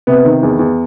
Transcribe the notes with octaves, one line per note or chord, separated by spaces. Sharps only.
C3 B3
D#3
E2
E2